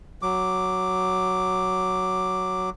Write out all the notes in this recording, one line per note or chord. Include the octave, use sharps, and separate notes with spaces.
F#3 D6